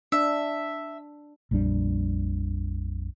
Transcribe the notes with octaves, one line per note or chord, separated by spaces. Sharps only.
D4 E5
A#1 F2 G3 D4